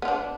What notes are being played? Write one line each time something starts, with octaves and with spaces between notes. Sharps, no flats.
B3 D4 F4